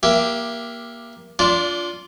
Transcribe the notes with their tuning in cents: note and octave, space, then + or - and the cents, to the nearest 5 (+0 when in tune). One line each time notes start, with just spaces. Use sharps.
A#3 +20 G4 +0 E5 +30
D4 -25 F4 +0 D5 +0